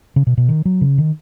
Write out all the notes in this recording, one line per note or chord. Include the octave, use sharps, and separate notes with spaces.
C#3
B2
B2
D#3
F#3
C#3
D#3